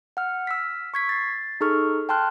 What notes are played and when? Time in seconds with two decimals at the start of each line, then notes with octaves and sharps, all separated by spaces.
0.17 F#5 F6
0.47 E6 F6 B6
0.94 C#6 G#6 B6
1.09 A6 C7
1.61 D#4 G#4 A4 C#6 F6
2.09 G5 A5 C6 F6 F#6